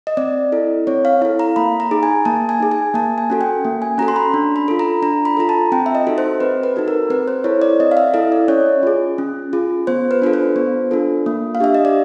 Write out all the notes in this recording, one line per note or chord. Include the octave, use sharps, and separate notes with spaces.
D#5
C4 D5
E4 A4
C4 C#5
F5
E4 A4 F5
A#5
A#3 B5
A#5
D#4 G#4
G#5
A#3 A5
G#5
D#4 G#4
G#5
A#3 A5
G#5
C#4 F#4 A4
G5
A#3
G#5
C#4 F#4 A4 A#5
C6
B5
D4
B5
F4 A4
A#5
D4 A#5
B5
F4 A4 A#5
A5
C4 G5
E5
D#5
D#4 F#4 A4
C5
C4 B4
B4
D#4 F#4 A4
A#4
C4 B4
C5
E4 A4 C#5
D5
C4 D#5
F5
E5
E4 A4 D#5
D5
C#4 C#5
F4 G#4
C#4
F4 G#4
B3 C5
B4
D4 F4 A4 B4
C5
B3
D4 F4 A4
A#3
F5
D4 G4 E5
D#5
D5